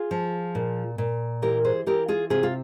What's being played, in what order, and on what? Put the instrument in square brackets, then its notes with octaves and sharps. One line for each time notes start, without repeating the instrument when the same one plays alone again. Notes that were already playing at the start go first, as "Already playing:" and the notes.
Already playing: [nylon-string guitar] F4 G#4
F3
A#2
A#2
E3 G4 A#4
G#4 C5
E3 G4 A#4
F4 G#4
C3 F4 G#4
F4